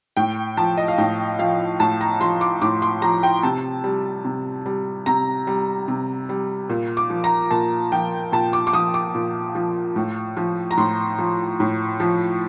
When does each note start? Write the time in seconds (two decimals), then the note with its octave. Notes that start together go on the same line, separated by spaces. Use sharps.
0.17 A2 G5
0.57 F3 A5
0.77 D#5
0.88 F5
0.98 A2 G5
1.39 F3 F5
1.80 A2 A5
2.01 A#5
2.21 F3 C6
2.41 D6
2.62 A2 D6
2.82 C6
3.02 F3 A#5
3.23 G5
3.43 C3 A5
3.84 G3
4.25 C3
4.66 G3
5.06 C3 A#5
5.47 G3
5.88 C3
6.29 G3
6.70 A#2
6.97 D6
7.10 F3
7.24 A#5
7.51 A#2 A5
7.92 F3 G5
8.32 A#2 A5
8.53 D6
8.67 D6
8.73 F3 D#6
8.94 D6
9.15 A#2
9.55 F3
9.96 A2
10.37 F3
10.71 A#5
10.77 A2 C6
11.19 F3
11.60 A2
12.00 F3